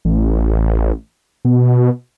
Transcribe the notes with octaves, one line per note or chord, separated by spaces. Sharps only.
A1
B2